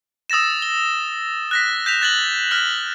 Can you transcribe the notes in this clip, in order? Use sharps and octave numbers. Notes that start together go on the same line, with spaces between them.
D#6 E6 A6 A#6 E7
G7
F#6 A#6 B6
G6 B6 E7 F7
F#6 A6 A#6 F#7 G7
F6 F#6 B6 G7